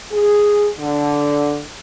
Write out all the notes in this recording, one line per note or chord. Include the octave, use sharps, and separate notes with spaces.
G#4
D3